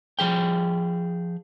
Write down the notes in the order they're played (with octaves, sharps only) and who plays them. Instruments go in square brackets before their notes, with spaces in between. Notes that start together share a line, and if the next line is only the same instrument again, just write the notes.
[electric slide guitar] F3 G#4 G5